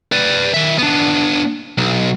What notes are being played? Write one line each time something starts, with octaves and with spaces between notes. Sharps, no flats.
B4 D5
D#3 E5
B3 D4
B1